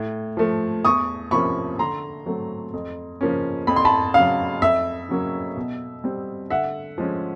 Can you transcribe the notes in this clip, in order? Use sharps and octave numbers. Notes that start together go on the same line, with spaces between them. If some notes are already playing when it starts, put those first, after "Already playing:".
Already playing: A2
F3 A3
E2 C#6 D#6
C3 F3 A#3 C#4 B5 C#6
D3 A#5 C6
F#3 A3 C4
F2
C#3 F3 A#3 C#4
F2 B5
C6
A5 B5
C#3 F#3 F5
F2 E5
C#3 F#3 A#3 C#4
B2
G3 C4
D3 E5 F#5
F3 G#3 C#4